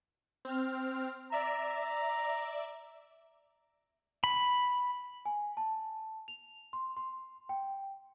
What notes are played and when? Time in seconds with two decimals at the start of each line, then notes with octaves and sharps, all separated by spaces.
0.45 C4 F6
1.32 D5 E5 A#5
4.24 B5
5.25 G#5
5.57 A5
6.28 F7
6.73 C6
6.97 C6
7.49 G5